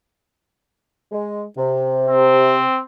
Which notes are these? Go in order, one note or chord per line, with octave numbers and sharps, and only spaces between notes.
G#3
C3
C4